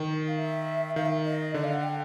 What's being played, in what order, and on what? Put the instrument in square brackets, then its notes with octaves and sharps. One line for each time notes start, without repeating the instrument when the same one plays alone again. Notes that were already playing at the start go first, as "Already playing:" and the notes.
Already playing: [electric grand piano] D#3
[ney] F5
E5
[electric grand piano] D#3 [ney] F5
[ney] E5
D#5
[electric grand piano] D3 [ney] D5
[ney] F5
F#5
G5